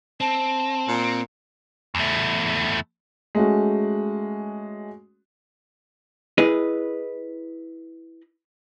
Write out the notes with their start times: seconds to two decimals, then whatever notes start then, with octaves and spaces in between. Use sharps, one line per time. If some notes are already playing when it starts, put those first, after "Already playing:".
0.20 C4 A5
0.88 A#2
1.95 E2 A3
3.35 G#3 A3 C#4 F#4
6.38 E4 G#4 B4 D#5